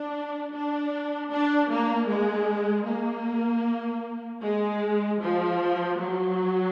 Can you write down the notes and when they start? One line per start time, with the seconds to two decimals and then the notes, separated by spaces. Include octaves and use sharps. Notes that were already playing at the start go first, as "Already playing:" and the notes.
Already playing: D4
0.53 D4
1.31 D4
1.70 A#3
2.09 G#3
2.87 A#3
4.43 G#3
5.22 F3
5.99 F#3